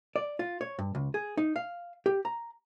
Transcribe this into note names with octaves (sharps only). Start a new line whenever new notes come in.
D5
F4
C#5
G2
C#2
G#4
D#4
F5
G4
A#5